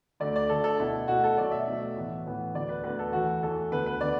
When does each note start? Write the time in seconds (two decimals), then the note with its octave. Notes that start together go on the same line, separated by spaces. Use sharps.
0.20 D2 D3 A3 D5
0.36 D5
0.49 D2 D3 A3 A4
0.64 A4
0.80 B2 A3 E4
1.08 B2 A3 F#4
1.24 A4
1.38 B2 F#3 A3 D5
1.52 E5
1.67 B2 F#3 A3
1.97 A2 E3 B3
2.26 A2 E3 B3
2.54 D2 D3 B3 D5
2.69 B4
2.84 D2 D3 B3 B4
2.99 A4
3.13 E2 E3 A3 F#4
3.43 E2 E3 A3 A4
3.72 D2 D3 B3 B4
3.86 B4
4.01 D3 B3 D5